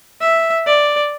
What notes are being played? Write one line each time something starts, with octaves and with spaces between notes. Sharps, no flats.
E5
D5